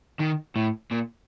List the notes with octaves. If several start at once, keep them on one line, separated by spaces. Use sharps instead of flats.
D#3
A2
A#2